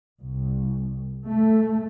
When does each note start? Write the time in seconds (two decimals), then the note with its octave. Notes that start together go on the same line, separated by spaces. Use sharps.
0.22 C2
1.28 A3